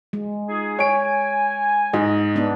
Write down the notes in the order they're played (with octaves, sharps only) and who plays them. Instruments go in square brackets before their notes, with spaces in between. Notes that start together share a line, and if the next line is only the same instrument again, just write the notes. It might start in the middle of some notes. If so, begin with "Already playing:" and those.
[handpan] G#3
[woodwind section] D#4 F4 G#4
[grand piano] C#5 D7 [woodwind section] G#5
[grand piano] G#2 [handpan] D#5
[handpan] B3 D4